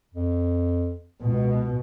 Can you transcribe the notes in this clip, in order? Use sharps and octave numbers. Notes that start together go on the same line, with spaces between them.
F2
C#2 B2